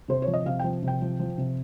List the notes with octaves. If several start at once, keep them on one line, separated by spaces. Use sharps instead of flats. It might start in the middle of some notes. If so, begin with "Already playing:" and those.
C3 C5
C#5
F3
D#5
C3 F5
F3 G5
C3
G5
F3
F3
C3